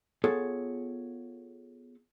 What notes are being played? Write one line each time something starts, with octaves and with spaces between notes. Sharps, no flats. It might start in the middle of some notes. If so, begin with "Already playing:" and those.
B3 F4 G#4 A4 C#5